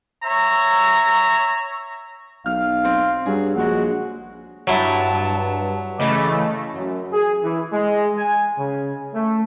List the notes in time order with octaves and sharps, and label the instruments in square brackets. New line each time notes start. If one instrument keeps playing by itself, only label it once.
[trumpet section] C#5 E5 A#5
[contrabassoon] B1 [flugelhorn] F5 [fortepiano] F6
[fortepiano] C4
[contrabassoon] G2 [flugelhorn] F#3 [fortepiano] G#4
[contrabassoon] A#1 [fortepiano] C#3 G#3 [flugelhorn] F#4
[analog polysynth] G2 [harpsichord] F#3 E4 [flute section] A5
[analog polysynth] C#3 E3 A3 [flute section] D#5 B5 D6
[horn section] F#2
G#4
E3
G#3
G#5
C#3
A3